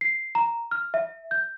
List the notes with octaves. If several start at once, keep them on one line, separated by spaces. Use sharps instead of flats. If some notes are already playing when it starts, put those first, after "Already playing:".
C7
A#5
F6
E5
G6